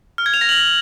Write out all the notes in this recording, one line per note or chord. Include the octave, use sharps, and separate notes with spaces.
F6
G#6
F7
A#6
F#7